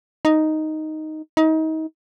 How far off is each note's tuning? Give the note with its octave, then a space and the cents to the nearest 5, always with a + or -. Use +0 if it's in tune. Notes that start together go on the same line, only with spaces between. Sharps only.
D#4 +0
D#4 +30